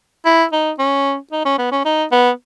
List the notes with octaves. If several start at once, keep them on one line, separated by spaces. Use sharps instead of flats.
E4
D#4
C#4
D#4
C#4
B3
C#4
D#4
B3